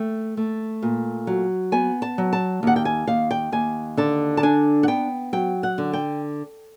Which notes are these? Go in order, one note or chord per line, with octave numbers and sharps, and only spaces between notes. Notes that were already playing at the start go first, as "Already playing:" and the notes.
Already playing: A3 G5
A3
A#2
F#3
B3 G#5
A5
F#3
A5
D#2 F#5
G5
G#5
D#2 F5
G5
D#2 G#5
D3 A5
A5
D4 G#5
F#5
B3 G5
F#3 G5
F#5
D3
G5